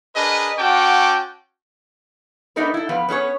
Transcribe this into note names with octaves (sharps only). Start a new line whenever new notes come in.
D4 G#4 A#4 B4 D#5
C#4 F#4 F#5 G5 A5 D6
A3 B3 D4 D#4 A#4 B4
E4 A4
F3 B3 B4 F5
B3 C#4 A4 C#5